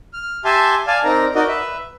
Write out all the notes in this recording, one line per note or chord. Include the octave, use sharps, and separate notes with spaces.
F6
G4 E5 G#5 A5 C6
D5 F5 G#5 A5
C4 D#4 A#4 D5 A#5
D#4 F#4 A#4 D5 D#5
B4 E5